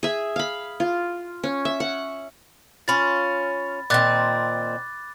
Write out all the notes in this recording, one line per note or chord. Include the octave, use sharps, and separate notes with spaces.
G#4 E5
F5 B5
F4
C#4
E5
F#5
C#4 F4 B5 A6
A#2 D#3 C4 D6 F#6 A6